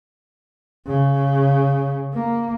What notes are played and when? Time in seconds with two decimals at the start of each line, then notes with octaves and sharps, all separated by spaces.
0.86 C#3
2.13 A#3